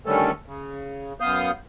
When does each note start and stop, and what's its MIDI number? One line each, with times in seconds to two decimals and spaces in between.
0.06 0.31 50
0.06 0.31 51
0.06 0.31 55
0.06 0.31 57
0.06 0.31 61
0.06 0.31 69
0.46 1.13 49
1.20 1.51 42
1.20 1.51 59
1.20 1.51 77
1.20 1.51 87
1.20 1.51 91